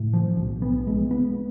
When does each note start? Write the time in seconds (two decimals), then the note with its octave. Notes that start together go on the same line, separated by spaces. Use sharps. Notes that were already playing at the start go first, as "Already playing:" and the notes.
Already playing: A2
0.13 F3
0.37 B1
0.62 B3
0.87 G#3
1.11 B3